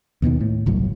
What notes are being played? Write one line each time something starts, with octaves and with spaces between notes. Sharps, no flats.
D#2 B2 D3 D#3
A2
G1 C2 A2 F#3